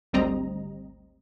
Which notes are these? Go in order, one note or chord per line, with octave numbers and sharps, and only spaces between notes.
G#1 D2 G3 C4 D#5 A#5